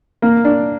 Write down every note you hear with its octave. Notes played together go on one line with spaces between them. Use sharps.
A#3
D4